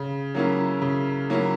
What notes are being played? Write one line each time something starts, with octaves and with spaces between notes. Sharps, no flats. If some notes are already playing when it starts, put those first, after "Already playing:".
Already playing: C#3
F#3 A#3 C#4 E4
C#3
F#3 A#3 C#4 E4